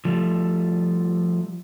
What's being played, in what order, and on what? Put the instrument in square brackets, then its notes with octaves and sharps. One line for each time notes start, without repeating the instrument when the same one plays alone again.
[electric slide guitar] F3 G3 A3